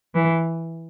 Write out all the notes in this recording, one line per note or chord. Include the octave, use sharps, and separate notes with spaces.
E3